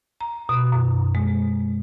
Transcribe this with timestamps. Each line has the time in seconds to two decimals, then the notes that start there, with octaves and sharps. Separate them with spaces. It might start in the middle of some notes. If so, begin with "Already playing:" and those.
0.21 A#5
0.49 B2
0.72 F#2
1.15 G#3